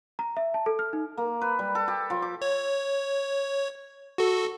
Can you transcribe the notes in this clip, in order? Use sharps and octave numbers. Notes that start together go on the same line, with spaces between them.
A#5
E5
A5
A4
F6
D#4
A#3
B4
G3
A4
G4
F3
D6
C#5
F#4 A4